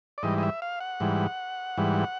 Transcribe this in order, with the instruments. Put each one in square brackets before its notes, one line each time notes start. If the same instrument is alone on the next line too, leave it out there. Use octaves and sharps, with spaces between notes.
[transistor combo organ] D5
G#2 E3 G3 D#5
D#5
E5
F5
F#5
G#2 E3 G3
G#2 E3 G3